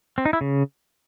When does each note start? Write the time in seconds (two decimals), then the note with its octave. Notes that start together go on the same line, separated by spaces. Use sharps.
0.18 C4
0.25 D#4
0.33 E4
0.41 C#3